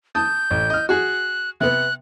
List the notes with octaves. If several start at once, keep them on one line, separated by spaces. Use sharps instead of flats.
A5 D#6 G6
A1
D#5 F6
F#4 G#4 F#6
C3 B3 F#6